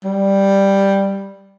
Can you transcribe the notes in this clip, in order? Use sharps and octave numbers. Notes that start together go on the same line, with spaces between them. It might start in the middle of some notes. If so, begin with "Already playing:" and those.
G3